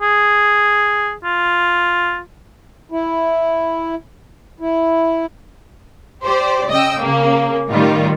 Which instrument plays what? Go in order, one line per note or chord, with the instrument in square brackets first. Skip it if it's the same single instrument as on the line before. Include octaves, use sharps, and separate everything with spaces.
[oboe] G#4
F4
[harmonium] E4
E4
[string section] G4 C5 D5
C#3 D#5 G5 E6
C#3 A#3
A2 D#3 G3 F4